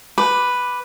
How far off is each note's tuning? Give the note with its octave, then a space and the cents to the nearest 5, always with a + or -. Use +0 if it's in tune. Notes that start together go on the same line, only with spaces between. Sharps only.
B4 +0 D6 +0